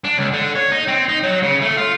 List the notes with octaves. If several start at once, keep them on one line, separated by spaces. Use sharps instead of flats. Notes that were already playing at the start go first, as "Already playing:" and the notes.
D4
C#2
D3
C#5
D#4
C4
D#4
F#3
C#3
A3
F4